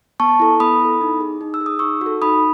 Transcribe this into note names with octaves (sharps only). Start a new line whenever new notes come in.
B3 A5 C#6
E4 A4
B3 B5 D#6
E4
A4
D#4
G#4
D#4
E6
G#4
D#6
D#4 C#6 E6
F#4 A4
D#4 B5 D#6